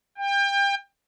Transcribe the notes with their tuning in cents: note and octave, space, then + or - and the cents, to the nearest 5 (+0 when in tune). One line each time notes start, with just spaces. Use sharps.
G5 +30